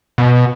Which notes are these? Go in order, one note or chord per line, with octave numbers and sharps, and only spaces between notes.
B2